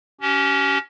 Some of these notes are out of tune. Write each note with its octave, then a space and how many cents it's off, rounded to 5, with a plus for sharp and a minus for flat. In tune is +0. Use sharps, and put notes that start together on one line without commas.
C#4 +20 G4 -35